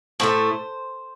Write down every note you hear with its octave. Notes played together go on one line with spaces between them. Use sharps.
A2 A3 C5